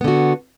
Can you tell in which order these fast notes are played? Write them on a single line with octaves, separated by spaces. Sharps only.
B3 D3 F#4